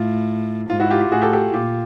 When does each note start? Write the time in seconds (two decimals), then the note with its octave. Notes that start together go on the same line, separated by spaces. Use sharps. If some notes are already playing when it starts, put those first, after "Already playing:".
Already playing: A2 F4
0.70 G#2 F4
0.80 E4 F#4
0.91 F4 G4
1.01 F4 G4
1.12 A2 F#4 G#4
1.22 G4 A4
1.33 G4 A4
1.53 A#2 F4 G4